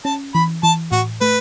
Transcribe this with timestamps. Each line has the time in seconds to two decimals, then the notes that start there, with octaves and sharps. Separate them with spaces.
0.05 C#4 A5
0.34 E3 B5
0.63 E3 A5
0.92 A2 F#4
1.21 A3 B4